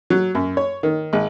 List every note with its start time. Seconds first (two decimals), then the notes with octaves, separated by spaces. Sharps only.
0.10 F#3
0.35 F#2
0.57 C#5
0.83 D#3
1.13 G#1